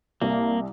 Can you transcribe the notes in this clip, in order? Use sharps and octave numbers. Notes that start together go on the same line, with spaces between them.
C2 A#3